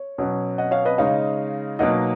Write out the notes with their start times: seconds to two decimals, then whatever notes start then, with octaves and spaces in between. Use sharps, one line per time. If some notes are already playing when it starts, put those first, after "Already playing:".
Already playing: C#5
0.18 B2 F#3 C#4
0.58 D#5 F#5
0.71 C#5 F5
0.85 B4 D#5
0.98 C#3 G#3 D#4 C#5 F5
1.79 B2 F#3 A#3 D#4 D#5 F#5